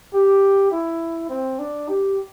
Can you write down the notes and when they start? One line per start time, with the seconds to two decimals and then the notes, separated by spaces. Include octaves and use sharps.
0.13 G4
0.71 E4
1.29 C4
1.59 D4
1.88 G4